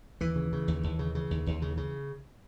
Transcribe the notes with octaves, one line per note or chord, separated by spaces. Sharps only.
D#2 E3
C#3
C#3
D#2
D#2
C#3
C#3
D#2
D#2
C#3
C#3